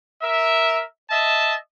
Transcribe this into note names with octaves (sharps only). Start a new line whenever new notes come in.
A#4 E5
D#5 E5 A5